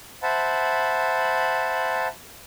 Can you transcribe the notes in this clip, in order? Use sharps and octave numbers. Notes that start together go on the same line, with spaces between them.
C5 E5 F#5 A5 B5